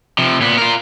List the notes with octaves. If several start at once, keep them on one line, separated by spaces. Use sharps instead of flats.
C3 F3
A#2 B3
F4 A#4